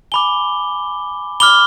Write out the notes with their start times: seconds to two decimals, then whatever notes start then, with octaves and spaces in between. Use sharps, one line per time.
0.12 G#5 B5 D6 G7
1.40 B5 D6 F6 G7